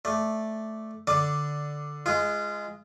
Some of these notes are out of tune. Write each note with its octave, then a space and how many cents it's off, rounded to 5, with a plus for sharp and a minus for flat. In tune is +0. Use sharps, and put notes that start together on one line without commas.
A3 -5 D5 +0
D3 +0 D5 +0 D6 +0
G#3 +0 F4 -35